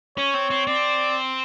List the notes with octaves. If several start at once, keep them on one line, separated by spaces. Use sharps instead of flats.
C#4 C#5
C4
C4
C4 D5